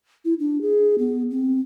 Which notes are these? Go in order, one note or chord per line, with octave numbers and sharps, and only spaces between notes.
E4
D4
G#4
B3
C4